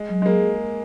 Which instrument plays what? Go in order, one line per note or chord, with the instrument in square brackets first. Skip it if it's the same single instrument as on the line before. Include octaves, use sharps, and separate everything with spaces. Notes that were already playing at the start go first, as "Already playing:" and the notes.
Already playing: [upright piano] G#3
[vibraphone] F#3
[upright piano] G#3
[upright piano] A#3 [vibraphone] G#4